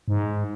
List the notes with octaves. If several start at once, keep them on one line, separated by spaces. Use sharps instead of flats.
G#2